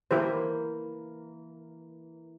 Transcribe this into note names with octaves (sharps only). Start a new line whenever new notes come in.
E3 A#3 E4 G4 C5